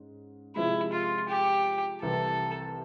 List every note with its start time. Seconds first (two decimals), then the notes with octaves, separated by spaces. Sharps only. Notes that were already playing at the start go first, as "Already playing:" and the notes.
Already playing: G#2 C#4
0.56 C3 F3 G#3 E4
0.92 F4
1.29 G4
2.02 C2 C3 E3 A4